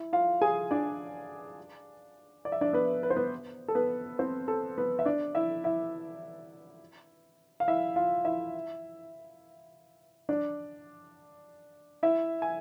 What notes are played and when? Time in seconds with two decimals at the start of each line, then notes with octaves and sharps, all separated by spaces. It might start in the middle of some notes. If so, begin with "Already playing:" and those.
Already playing: E4
0.13 F4 F5
0.42 G#4 G#5
0.71 D4 D5
2.45 D5
2.52 E5
2.61 D4 D5
2.73 B3 B4
3.03 B4
3.10 C5
3.16 B3 B4
3.68 A4
3.75 B3 B4
4.19 C4 C5
4.48 A4
4.78 B3 B4
4.99 E5
5.05 D4 D5
5.35 E4 E5
5.64 E4 E5
7.60 F5
7.68 E4 E5
7.96 F4 F5
8.25 E4 E5
10.29 D4 D5
12.03 E4 E5
12.42 G#5